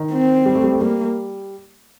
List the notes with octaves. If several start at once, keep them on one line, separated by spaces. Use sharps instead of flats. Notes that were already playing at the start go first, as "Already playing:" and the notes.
Already playing: D#3
C4
G3
A3
G3
A3
G3 A#3